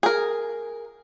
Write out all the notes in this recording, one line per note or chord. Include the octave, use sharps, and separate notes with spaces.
G#4 A#4